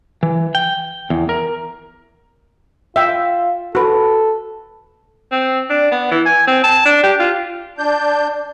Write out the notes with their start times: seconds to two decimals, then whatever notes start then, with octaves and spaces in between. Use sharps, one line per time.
0.23 E3
0.55 G5
1.10 E2
1.29 A#4
2.96 F4 E5 G5
3.75 F#4 A4 B4
5.31 C4
5.69 D4
5.91 B3
6.11 E3
6.25 G#5
6.47 C4
6.63 A5
6.85 D4
7.03 G4
7.19 F4
7.78 D4 G6